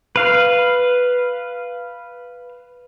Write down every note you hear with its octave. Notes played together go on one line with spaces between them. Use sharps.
B4 F5